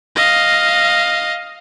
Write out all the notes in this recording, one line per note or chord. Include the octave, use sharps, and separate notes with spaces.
D#5 F5